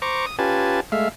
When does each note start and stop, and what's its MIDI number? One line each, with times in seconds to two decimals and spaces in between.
0.02 0.26 72
0.02 0.26 82
0.02 0.26 85
0.02 0.26 86
0.26 0.36 87
0.39 0.80 61
0.39 0.80 65
0.39 0.80 67
0.39 0.80 71
0.39 0.80 80
0.39 0.80 81
0.92 1.09 56
0.92 1.09 57
0.92 1.09 76
0.92 1.09 77